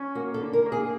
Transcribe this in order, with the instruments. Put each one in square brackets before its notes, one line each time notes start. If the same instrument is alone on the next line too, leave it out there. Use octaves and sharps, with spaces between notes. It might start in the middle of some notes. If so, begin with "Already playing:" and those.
Already playing: [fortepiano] C#4
[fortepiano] A#3 [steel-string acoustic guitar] F#4
[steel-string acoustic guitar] A4
[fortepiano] D3
[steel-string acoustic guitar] A#4
[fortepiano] A#3
[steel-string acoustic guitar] G#4